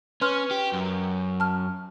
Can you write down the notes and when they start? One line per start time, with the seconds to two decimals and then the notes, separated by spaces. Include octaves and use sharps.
0.21 C#4 B4 C6 F6
0.51 G4
0.73 F#2
1.40 A5 F6